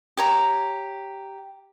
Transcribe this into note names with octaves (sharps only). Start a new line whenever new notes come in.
G4 C#5 A#5